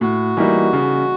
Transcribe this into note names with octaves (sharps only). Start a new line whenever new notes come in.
A2 F#4
E3 G3 A#3 D#4
C#3